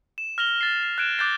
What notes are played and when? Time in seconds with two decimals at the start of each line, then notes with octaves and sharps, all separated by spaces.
0.18 E7
0.38 F6 A#6 F7 G7
0.61 F6 A6 C7
0.83 C7
0.98 F#6 G#6 D7 E7
1.18 D6 F#6 G6 A6 C7